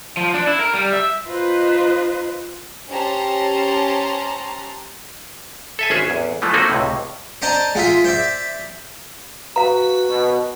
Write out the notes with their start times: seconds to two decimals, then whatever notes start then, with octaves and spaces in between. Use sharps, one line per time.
0.17 F3
0.34 D4
0.47 E4
0.60 A#4
0.74 G3
0.93 E5
1.26 D#4 F4 B4 C5 D#5
2.89 C#4 G4 C5 A5 A#5 C6
5.79 A4 E5 G#5
5.90 G#1 C#4 G#4 E5
6.06 A1 E2
6.42 E3 F3 G#3 A3
6.54 A3 A#3 C4 D#4 F#4
6.69 C#2 A2 C3
7.42 C5 D5 D#5 A5 A#5
7.75 G#3 F4 E5
8.04 C5 D5 E5
9.56 F#4 B4 F5 A#5
10.08 B2